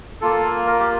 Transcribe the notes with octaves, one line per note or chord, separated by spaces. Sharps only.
A#3 F4 A4
A#4
G4